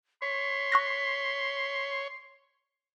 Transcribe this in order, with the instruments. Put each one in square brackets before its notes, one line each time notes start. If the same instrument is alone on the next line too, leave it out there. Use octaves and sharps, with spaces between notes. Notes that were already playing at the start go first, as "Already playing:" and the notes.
[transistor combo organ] C#5 [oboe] C6 [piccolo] B6
[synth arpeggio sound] C#6 F#6 A#6